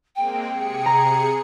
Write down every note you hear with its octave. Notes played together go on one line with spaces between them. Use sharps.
G#3 A#3 C4 G5
C3 G#4 C#7
A#5